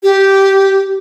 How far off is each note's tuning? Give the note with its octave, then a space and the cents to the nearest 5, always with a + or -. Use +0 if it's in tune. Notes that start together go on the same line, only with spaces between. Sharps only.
G4 -10